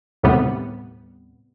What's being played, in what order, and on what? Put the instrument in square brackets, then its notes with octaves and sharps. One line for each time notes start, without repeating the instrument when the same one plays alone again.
[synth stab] D#2 A2 C3 G3 B3